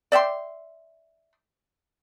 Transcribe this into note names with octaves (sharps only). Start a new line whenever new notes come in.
D5 E5 G5 C6